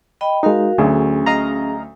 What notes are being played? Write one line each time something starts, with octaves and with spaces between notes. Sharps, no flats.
D#5 G5 B5
G#3 D#4 F#4 A#4 F5
D2 D3 F#3 C#4 G#4
D#5 F5 A#5